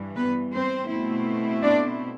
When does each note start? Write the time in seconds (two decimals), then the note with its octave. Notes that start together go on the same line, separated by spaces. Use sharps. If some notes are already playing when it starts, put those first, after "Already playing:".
Already playing: G2 E3
0.15 B3 B4
0.52 C4 C5
0.89 B2 A3 C4 E4
1.62 D4 D5